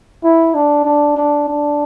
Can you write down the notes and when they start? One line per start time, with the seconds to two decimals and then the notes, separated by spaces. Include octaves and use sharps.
0.24 E4
0.55 D4
0.85 D4
1.17 D4
1.48 D4